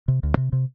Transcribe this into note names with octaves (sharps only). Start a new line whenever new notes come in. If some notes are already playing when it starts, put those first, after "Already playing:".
C3
D2
C3
C3